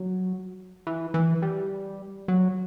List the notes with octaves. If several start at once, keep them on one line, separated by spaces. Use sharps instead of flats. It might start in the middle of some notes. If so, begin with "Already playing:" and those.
Already playing: F#3
E3
E3
G3
F#3